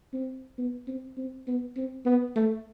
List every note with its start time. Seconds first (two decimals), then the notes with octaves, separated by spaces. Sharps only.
0.13 C4
0.58 B3
0.87 C4
1.17 C4
1.47 B3
1.76 C4
2.06 B3
2.36 A3